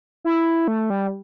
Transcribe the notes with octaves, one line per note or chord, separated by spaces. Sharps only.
E4
A3
G3